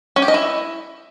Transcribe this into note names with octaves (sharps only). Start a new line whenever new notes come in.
C#4
G4
D#5
E4